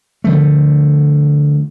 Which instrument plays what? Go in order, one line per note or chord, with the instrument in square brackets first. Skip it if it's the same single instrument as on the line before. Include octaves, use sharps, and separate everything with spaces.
[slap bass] D3 F3 A3